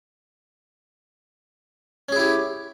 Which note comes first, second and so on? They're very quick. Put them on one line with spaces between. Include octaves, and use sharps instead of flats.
C#4 G#4 E4 G4